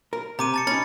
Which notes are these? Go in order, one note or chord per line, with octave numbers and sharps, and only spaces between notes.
A#4
C3 A#5 D6 D#7
A5 A6 C#7
C#4 D#4 B5 A6 C#7